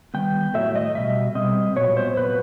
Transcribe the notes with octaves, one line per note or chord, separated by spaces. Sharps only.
D#3 G3 B3 G5
A2 F#3 A3 E5
D#5
B2 G3 E5
B2 G3 C4 D#5
A#2 F#3 B3 C#5
C5
A#2 F#3 B3 B4